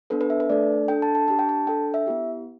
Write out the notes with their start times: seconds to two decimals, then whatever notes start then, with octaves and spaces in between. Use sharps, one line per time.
0.10 B3 D4 A4 B4
0.21 B4
0.30 E5
0.40 B4
0.49 A3 D4 A4 D5
0.88 D4 A4 G5
1.02 A5
1.15 A5
1.28 D4 G4 A5
1.39 G5
1.49 A5
1.67 D4 A4 G5
1.94 E5
2.07 B3 E4 G4